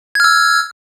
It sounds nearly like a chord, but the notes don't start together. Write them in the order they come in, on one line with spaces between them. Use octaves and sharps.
G#6 F6 E6